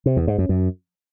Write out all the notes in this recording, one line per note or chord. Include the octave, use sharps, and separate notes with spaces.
C3
E2
G#2
F#2
F#2